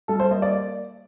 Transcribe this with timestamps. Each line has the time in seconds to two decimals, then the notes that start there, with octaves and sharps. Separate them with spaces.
0.08 G3 A4
0.20 C5
0.31 A#3 D#5
0.42 D5